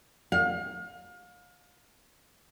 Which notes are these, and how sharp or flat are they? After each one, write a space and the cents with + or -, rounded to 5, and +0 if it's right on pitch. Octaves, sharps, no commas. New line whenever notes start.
F5 +35